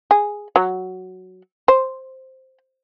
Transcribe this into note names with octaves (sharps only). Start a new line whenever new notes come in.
G#4
F#3
C5